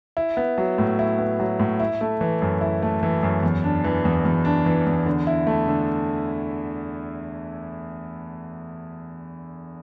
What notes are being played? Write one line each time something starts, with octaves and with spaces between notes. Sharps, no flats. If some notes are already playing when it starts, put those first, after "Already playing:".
E4
B3
F#3
A2
E4
B3
F#3
A2
E4
A3
E3
F#2
E4
A3
E3
F#2
E2
D4
E3
E2
E2
D4
E3
E2
D3
E4
A3
D3